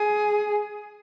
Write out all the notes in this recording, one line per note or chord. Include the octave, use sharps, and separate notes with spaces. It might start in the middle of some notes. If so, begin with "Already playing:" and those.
Already playing: G#4